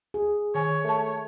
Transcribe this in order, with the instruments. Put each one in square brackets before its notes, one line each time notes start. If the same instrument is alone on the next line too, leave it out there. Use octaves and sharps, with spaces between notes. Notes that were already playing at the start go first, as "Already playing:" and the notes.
[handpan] G#4
[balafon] D#3 G#5 [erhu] C#5
[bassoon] A3 [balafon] A#4 A5